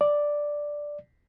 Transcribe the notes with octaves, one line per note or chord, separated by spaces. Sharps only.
D5